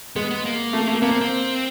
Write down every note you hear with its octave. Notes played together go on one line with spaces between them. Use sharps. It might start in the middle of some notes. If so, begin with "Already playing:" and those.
G#3 B3
B3
A#3
A3
A3
A#3 B3
C4
C4